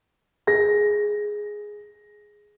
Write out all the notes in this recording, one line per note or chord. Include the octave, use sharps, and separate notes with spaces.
G#4 A#6